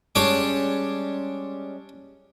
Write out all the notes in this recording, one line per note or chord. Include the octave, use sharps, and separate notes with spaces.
G3 G#3 C#4 D4 C#5 D6